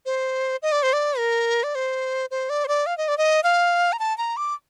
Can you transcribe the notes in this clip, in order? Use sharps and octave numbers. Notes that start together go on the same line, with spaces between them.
C5
D#5
D5
C5
D5
A#4
D5
C5
C5
D5
C5
D5
F5
D#5
D5
D#5
F5
A#5
A5
A#5
D6